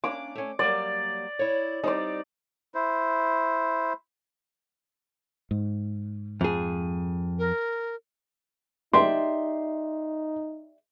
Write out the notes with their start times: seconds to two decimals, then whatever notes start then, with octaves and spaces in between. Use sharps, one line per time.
0.04 A#3 C#4 D4 D6
0.35 A3 C#4
0.59 F#3 G3 A#3 D5
1.39 E4 C#5
1.83 G3 C4 D#4 D5
2.75 E4 C5
5.51 G#2
6.41 F2 G#4
7.39 A#4
8.93 D#4 G4 D5 E5 C6